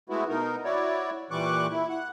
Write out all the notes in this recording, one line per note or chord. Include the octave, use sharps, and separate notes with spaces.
G#3 A3 B3 E4 F#4
B2 D#4 A#4
E4 F#4 C#5 D5
A#2 E3 G3 C#6 D6 F#6
E4
F#5